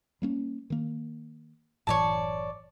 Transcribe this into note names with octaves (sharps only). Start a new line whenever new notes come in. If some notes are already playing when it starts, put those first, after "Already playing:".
G3 A#3 C#4
D#3 A#3
F#1 A2 E3 C#5 D5 A5